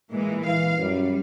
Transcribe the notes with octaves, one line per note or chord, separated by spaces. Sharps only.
A#2 E3 G#3
E3 F5
F#2 G3